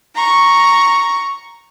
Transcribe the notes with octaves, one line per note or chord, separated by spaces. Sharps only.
A#5 C#6